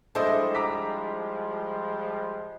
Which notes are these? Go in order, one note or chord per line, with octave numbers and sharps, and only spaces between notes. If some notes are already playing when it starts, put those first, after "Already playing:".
F3 G3 G#3 D4 E4 A4 C5 D#5
A#5 D6 B6